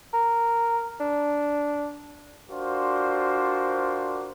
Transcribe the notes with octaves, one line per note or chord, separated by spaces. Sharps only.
A#4
D4
D4 F4 F#4 A#4 C5 D5